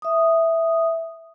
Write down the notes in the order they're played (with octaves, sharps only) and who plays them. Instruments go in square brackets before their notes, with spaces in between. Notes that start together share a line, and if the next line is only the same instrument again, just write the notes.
[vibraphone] E5 D#6